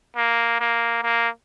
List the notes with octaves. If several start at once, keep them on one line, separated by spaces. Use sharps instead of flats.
A#3
A#3
A#3